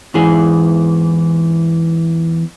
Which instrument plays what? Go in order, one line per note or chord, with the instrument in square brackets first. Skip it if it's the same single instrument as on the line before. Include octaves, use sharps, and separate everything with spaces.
[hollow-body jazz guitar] E2 G#2 E3 G#4